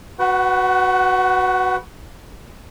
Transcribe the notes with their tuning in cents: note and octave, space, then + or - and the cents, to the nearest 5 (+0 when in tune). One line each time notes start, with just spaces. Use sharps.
F#4 +0 B4 +0 F#5 +35